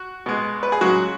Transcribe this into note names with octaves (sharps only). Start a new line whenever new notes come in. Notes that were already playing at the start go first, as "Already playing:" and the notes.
Already playing: F#4
B2 G#3
B4
G#4
C#3 F#3 G#3 F#4